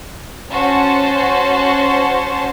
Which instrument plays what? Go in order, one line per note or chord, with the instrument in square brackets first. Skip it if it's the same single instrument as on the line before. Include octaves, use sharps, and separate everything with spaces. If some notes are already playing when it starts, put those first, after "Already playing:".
[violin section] C#4 F#4 C5 A5